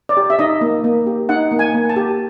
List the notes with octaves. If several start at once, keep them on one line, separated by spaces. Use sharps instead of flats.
D5
G4
E5
D#4 D#5
A#3
A#3
G4
D#4 F#5
A#3
G#5
A#3
A5
G4